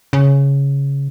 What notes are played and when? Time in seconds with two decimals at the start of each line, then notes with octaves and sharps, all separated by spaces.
0.13 C#3